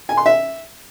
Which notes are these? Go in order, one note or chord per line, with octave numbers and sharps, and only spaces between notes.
G#5
C6
E5